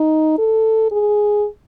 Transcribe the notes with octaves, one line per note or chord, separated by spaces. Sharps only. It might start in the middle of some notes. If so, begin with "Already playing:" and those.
Already playing: D#4
A4
G#4